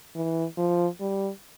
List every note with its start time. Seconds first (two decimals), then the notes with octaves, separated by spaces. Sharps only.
0.15 E3
0.57 F3
1.01 G3